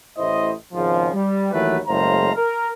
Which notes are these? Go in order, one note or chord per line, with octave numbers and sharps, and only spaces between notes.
A1 A2 E4 C5 D#5
G#1 G#2 C#3 F3
G3
D#2 E3 F#3 A3 B4
F#1 A2 G#3 C5 F5 A#5
A#4